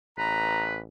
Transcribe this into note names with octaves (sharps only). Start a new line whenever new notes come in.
A1 B4 A#5